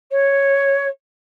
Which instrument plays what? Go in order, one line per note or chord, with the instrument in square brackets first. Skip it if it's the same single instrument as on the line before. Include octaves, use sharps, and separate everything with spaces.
[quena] C#5